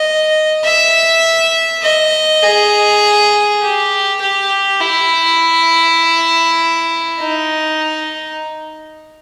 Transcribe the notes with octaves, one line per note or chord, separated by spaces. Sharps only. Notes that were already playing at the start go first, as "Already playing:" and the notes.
Already playing: D#5
E5
D#5
G#4
G4
G4
E4
D#4